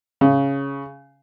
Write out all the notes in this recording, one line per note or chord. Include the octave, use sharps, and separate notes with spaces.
C#3